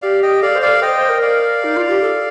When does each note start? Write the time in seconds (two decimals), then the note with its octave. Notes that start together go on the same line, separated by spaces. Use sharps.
0.02 G4 D5 F5
0.22 D#5 G5
0.42 A4 D5 F5
0.55 C5
0.62 D5 F5
0.68 A4
0.82 C5 D#5 G5
0.96 C5
1.09 A#4
1.22 D5 F5
1.64 D#4
1.77 F4
1.89 G4
2.02 A4